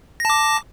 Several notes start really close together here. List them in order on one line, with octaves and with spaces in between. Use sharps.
A#6 A5 D6